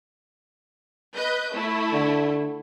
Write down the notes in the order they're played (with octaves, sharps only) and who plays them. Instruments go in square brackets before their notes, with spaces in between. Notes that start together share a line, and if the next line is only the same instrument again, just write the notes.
[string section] B4 D#5 G6
A3 E4
[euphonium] D3